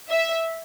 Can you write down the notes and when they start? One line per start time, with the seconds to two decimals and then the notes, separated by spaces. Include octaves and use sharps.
0.10 E5